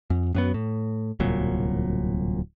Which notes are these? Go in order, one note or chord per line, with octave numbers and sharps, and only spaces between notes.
F2
F#2 F#3 B3
A2
D1 C2 A#2 F#3